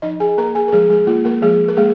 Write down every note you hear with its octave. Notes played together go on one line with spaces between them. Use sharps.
F3 D#4 D#5
G#4 G#5
A#3 A#4 A#5
G#4 G#5
A#4
F3 G#3 G#4
G#3 G#4
A#3 F4
A#3 A#4
F3 G#3 G#4
A#4
G#3 A#3 G#4